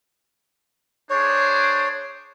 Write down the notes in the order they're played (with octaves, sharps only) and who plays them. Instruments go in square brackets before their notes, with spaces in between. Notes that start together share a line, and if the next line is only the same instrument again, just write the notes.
[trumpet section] D4 G#4 C5 [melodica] C#5